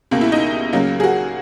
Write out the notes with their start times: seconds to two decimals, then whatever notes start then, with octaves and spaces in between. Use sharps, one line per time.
0.11 C#2 B2 A#3
0.21 E4
0.32 D#4
0.72 C#2 C#3 F#3 A#3
1.00 G#4
1.04 F#4